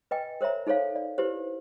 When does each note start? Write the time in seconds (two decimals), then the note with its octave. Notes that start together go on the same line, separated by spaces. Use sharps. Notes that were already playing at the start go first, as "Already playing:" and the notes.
0.11 B4 D#5 G5 G#5
0.41 A#4 C5 C#5 E5 A#5
0.67 D#4 A4 C5 C#5 F5
0.96 D5
1.18 E4 G4 B4 C5